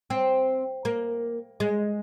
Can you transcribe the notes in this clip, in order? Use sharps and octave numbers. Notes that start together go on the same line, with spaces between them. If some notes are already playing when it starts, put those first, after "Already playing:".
C4
A#3
G#3